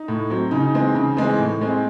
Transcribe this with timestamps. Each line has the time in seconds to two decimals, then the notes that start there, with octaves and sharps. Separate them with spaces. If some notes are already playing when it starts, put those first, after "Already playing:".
Already playing: D#4
0.08 A2
0.30 F#3 C4
0.51 C#3 D#4
0.74 E3 G#3 C4
0.95 C#3
1.17 E3 G#3 C4
1.39 A2
1.61 G#3 C4